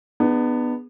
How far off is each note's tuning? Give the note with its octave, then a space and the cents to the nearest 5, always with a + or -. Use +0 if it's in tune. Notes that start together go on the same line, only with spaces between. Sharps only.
B3 +0 D4 +45 G#4 -10